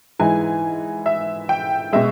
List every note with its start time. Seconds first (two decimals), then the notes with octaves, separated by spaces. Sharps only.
0.19 G#2 E3 G#3 G#5
1.06 E5
1.49 G5
1.93 B2 G#3 E5